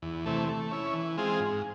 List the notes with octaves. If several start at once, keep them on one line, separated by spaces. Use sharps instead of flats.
E2
C3 E3 A3
A3
C#4 E4
E3
G#3 C4 F4 G#4
G#2